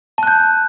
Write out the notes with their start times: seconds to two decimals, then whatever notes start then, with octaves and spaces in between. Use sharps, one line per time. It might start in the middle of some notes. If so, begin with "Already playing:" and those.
0.18 A5
0.23 F#6
0.27 G6